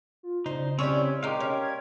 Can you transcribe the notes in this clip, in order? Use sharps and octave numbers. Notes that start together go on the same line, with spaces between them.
F4
C#3 D#4 C5
C4 C#4 E4 G4 A4 C#5
G#3 D#4 G4 A#4 F5 C6
C#4
G#6